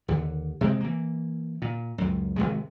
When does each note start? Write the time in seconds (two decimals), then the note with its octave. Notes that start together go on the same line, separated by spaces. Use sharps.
0.08 D#2 D3
0.61 C3 G#3 A#3 C4
0.80 E3 A#3
1.62 A#2
1.98 C#2 F#2
2.36 G#1 C#2 C3 G#3